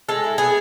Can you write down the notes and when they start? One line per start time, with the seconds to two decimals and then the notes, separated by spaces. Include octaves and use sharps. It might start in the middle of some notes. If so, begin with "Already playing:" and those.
0.09 G#3 A4
0.24 E4
0.38 B3 G#4